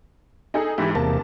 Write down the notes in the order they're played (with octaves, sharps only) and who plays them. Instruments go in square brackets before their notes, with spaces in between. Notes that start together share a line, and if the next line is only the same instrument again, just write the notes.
[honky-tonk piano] D#4 G#4 A4
[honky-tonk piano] G#2 E3 [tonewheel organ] E4 G4
[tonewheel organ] E2 C3 A#3 [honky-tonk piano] A5